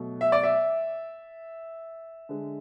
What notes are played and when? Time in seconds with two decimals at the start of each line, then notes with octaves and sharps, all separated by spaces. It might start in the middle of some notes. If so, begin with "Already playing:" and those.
Already playing: B2 F#3 A3
0.21 E5
0.32 D5
0.43 E5
2.29 D3 G#3